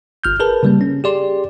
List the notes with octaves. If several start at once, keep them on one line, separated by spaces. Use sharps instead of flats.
G1 F6 G6
G#4 A#4 B4 A5
C#3 G3 A#3
C#4
G4 G#4 D5 C6